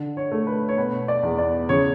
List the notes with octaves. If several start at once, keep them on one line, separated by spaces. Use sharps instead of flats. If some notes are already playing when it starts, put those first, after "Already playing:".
Already playing: D3
C#5
A3
C#5
B4
C#5
B2 B4
D5
E2
D5
C#3 C#5